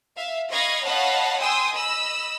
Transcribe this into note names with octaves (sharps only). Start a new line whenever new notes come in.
E5 F5
D#5 F5 B5 C#6 G#6 A#6
C#5 D#5 F5 F#5 A5 B5
G5 G#5 C6 D#6 E6
D#5 B5 E6